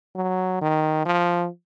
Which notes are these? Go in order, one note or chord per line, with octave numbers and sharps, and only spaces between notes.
F#3
D#3
F3